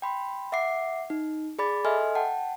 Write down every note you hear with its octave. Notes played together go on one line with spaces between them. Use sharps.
G5 B5 C6
E5 F#5 D6 C7
D#4
G#4 D5 B5 D6 A6
A4 D#5 E5 G#5 C6 F6
F#5 G5 A5